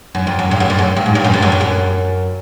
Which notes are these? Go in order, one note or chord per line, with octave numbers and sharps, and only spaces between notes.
F#2
F2
F#2
G2
F#2
F2
F#2
G2
G#2
G2
F#2
F2
F#2
F2
F#2